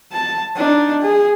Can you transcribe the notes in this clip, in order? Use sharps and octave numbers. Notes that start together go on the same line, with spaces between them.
A5
D4 D#4
G#4